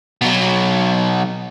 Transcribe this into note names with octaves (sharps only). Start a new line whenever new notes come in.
B2 F#3